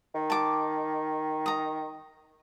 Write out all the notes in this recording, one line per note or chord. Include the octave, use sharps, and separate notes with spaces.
D#3
A5 D6
A#5 D#6